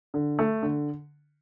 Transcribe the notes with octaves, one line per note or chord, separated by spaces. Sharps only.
D3
A3
D3